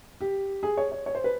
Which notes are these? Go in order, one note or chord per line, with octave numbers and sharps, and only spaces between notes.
G4
G#4
C#5
C#5
C#5
C5
B4